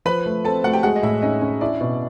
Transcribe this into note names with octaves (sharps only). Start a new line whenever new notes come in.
F3 B4 B5
A3
C4 A4 A5
A3 F#4 F#5
G4 G5
G#3 F#4 F#5
D#5
A2 E4 E5
C#4 D#4 D#5
C#4
D4 E4 D5
B2